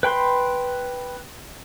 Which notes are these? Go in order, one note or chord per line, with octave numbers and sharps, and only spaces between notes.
B4 G5 B5 C6